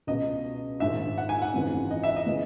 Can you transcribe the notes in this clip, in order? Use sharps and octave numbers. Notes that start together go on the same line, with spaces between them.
C#2 B2 D#5
A#1 G#2 D#3 E5
F#5
G#5
F#5
G#1 F#2 C#3 E3
D#5
E5
D#5
C#3 E3